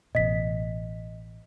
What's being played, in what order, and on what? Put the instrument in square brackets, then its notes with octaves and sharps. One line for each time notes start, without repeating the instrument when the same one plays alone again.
[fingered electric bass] A1 B2 [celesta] D#5 B6